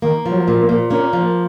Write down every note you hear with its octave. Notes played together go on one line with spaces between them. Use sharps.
D#3 A#3
F3
F#3
A#2
A#3
A#2
A#3 C#4
F3